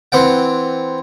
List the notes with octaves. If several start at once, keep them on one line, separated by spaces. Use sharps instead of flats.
E3 C4 F#5 G5